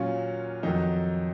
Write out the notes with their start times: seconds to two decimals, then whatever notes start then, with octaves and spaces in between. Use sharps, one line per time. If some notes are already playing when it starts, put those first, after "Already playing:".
Already playing: A#2 F#3 C#4 F4
0.63 F2 D#3 F#3 D#4